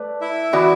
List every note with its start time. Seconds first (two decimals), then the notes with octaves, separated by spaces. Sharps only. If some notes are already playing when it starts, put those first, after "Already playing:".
Already playing: A3 B4 D5
0.21 E4 E5
0.53 E3 B3 F#4 D5